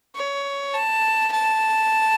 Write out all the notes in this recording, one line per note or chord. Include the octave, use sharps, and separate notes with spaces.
C#5
A5
A5